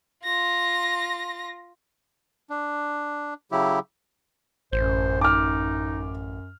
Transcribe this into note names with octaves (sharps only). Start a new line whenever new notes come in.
F4 A#6
D4
C#3 F#3 E4 G4
A1 F#2 C5
D#4 D6 F6